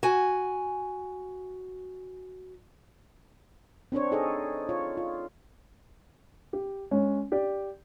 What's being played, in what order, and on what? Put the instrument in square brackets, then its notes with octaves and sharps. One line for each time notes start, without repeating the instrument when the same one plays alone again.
[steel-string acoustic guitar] F#4 G#5
[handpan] C4 D4 C5 C#5
D#4 G#4 A4 D#5
F4 C#5
F4
[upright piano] G4
G#3 C#4
G4 D5